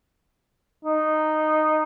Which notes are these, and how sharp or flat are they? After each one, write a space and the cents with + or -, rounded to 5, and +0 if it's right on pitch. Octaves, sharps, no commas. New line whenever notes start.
D#4 -10